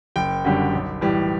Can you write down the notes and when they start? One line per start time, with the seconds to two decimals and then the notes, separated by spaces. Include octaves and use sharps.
0.16 F#1 G5
0.45 F#2 D3 G3
0.73 B1
1.01 A2 E3 G3